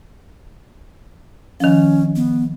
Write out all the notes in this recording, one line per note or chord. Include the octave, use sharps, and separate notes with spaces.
D#3 F3 C#4
B3